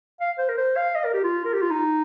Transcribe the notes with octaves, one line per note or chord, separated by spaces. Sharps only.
F5
C5
A#4
C5
F5
D#5
A#4
G4
F4
A#4
G4
F4
D#4